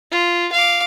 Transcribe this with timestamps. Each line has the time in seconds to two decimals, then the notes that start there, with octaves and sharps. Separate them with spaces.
0.12 F4
0.53 F5 D6